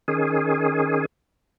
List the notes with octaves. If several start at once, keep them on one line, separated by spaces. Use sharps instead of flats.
D#3 C#4 G#4